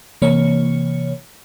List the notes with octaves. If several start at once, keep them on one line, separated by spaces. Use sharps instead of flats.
C3 E3 A#3 C#5 C#7